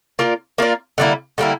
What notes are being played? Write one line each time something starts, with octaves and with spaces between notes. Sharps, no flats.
A#3 F4 A#4 D5
A#3 F4 A#4 D5
D3 G3 A#3 E4
D3 G3 A#3 E4